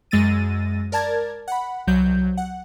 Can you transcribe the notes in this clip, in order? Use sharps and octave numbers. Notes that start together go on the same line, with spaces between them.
F#2 G#3 E6 A6 A#6 D#7
A#4 D5 A5 G#6 A6
F#5 B5
C2 F#3 G6
F#5